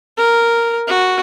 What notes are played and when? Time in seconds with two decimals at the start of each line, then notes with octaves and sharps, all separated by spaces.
0.18 A#4
0.88 F#4